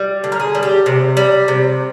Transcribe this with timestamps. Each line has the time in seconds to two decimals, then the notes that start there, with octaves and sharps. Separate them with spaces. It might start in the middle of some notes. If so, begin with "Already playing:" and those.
Already playing: G3
0.24 D3
0.32 A#4
0.40 G#4
0.55 G3
0.63 G4
0.86 C3
1.17 G3
1.48 C3